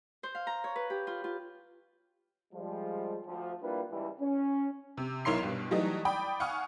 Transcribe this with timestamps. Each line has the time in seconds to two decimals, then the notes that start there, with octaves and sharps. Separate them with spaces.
0.23 C5
0.35 F5
0.47 A#5
0.64 C#5
0.76 B4
0.90 G4
1.07 F4
1.24 F4
2.54 F3 G3 G#3
3.27 D2 F3
3.62 G3 A#3 D4 E4 F4 B4
3.91 C#2 E3 G3
4.20 C#4
4.97 C3
5.25 B1 E4 A#4 C#5 C6 C7
5.43 G2 B2
5.71 E3 F#3 G3 A3 D#4
6.05 D5 G5 B5 D#6
6.40 F5 F#5 G#5 C#6 D#6 F6